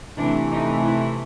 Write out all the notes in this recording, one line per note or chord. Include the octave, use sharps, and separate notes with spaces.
C3 E3 A3 D4
D#4
E4